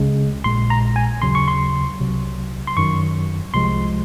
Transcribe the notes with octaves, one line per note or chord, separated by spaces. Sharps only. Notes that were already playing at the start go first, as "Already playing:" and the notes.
Already playing: C#2 C#3 G#3
A#1 A#2 G#3 C6
A#5
G#5
D#2 C#3 F#3 C6
C#6
C6
C2 C3 F#3
C6
F#2 D#3 F#3 C#6
C2 C3 F3 G#3 C6